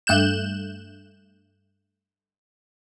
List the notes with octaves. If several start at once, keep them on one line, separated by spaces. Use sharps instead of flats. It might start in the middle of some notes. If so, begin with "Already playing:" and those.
G2 A3 F#6 G6 E7